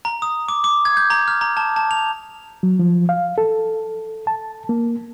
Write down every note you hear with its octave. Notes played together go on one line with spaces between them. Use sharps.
A#5
D#6
D6
D6
G#6
G6
A#5
F6
A#5
A5
A5
F7
F#3
F3
F5
A4
A5
A#3